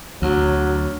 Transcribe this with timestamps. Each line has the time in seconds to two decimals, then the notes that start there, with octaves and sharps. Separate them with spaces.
0.22 D2 F#3